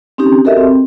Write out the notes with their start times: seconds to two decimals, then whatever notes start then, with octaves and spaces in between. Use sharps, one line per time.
0.18 C4 C#4 D#4 G4
0.45 F#4 G4 A4 A#4 D#5 E5
0.57 C4